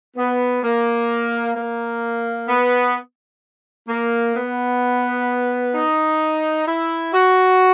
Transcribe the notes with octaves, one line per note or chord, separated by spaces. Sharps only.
B3
A#3
A#3
B3
A#3
B3
D#4
E4
F#4